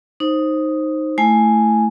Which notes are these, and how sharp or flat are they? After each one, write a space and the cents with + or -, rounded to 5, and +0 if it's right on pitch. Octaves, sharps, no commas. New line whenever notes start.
D#4 +0 C5 +15
A3 +0 E4 +0 G#5 +0